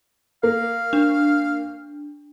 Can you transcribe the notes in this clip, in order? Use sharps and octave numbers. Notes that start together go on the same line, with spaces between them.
A#3 F5
D4